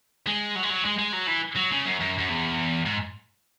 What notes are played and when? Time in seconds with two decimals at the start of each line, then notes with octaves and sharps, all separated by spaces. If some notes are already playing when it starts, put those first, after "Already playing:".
0.27 G#3
0.55 F#3
0.63 G#3
0.70 F#3
0.85 G#3
0.99 G#3
1.13 F#3
1.27 E3
1.56 F#3
1.71 C#3
1.85 F#2
2.00 F#2
2.18 F#2
2.29 E2
2.86 G#2